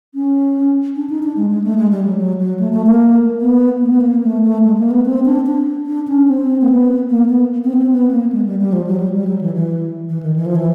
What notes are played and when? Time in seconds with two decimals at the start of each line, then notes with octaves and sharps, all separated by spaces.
0.15 C#4
0.96 D4
1.10 D#4
1.23 D4
1.37 G#3
1.50 G#3
1.64 A3
1.77 G#3
1.91 G3
2.05 F#3
2.18 F#3
2.39 F#3
2.59 A3
2.72 A3
2.86 A#3
3.41 B3
3.82 A#3
3.91 B3
4.01 A#3
4.23 A3
4.44 A3
4.64 G#3
4.78 A#3
4.91 B3
5.05 C4
5.25 D4
5.46 D4
5.86 D4
6.07 C#4
6.28 C4
6.62 A#3
6.69 B3
7.10 A#3
7.29 B3
7.64 C4
7.73 B3
7.77 C4
7.92 B3
8.11 A#3
8.32 G#3
8.46 G3
8.60 G3
8.73 F3
8.87 F#3
9.00 G3
9.14 G3
9.27 F#3
9.41 E3
9.55 E3
10.09 E3
10.23 D#3
10.36 E3
10.46 F3
10.56 E3